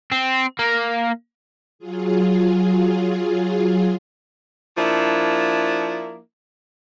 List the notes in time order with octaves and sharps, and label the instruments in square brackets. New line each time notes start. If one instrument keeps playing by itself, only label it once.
[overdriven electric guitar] C4
A#3
[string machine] F#3 F4 G#4
[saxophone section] F3 A#3 D4 E4